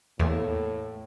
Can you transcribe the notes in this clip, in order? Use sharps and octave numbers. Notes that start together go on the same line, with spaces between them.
E2 A2 A3 A#3